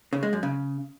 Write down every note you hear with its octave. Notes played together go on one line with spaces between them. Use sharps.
C#3
G#3
F#2
C#3